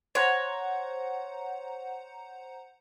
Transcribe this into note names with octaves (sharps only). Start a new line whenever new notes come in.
C5 C#5 F#5 A#5